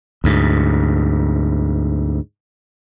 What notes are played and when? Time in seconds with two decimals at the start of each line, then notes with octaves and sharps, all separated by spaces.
0.24 D2 G#2